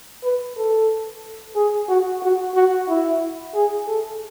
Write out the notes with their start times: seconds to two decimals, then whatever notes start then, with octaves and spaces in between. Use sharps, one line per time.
0.23 B4
0.57 A4
1.56 G#4
1.89 F#4
2.22 F#4
2.55 F#4
2.89 E4
3.54 G#4
3.88 A4